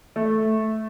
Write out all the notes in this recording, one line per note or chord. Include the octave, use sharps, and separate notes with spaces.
A3